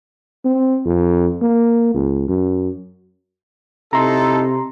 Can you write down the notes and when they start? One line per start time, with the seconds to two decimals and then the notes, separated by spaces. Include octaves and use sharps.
0.45 C4
0.86 F2
1.42 A#3
1.94 C#2
2.29 F#2
3.93 C3 D#4 E4 A4 A#5 C6